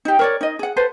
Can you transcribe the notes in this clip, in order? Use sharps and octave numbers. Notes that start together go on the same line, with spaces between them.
D#4 G4
A#4 C#5 D5
D#4 D#5
G#4 F#5
A4 B4 C5